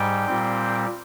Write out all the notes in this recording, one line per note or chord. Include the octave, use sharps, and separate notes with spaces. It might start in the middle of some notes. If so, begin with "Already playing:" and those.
Already playing: G#2 G3 G5
A#2 G3 C4